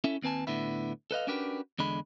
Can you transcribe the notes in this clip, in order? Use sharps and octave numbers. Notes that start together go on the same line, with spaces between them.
C#4 E4 A4 E5
D#2 C4 B4 G#5 A5
A2 D3 B3 E4
A4 B4 D#5 F5
C#4 D4 F#4 G4 A#4 B4
E2 D3 G#3 B5